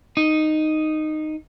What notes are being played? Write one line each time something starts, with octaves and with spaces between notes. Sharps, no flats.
D#4